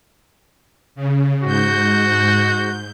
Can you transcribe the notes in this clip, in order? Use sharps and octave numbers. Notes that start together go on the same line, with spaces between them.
C#3
G#2 F#4 G6